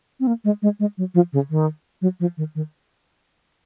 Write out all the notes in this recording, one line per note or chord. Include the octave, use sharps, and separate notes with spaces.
C4
A#3
G#3
G#3
G#3
F#3
F3
C#3
D#3
F#3
F3
D#3
D#3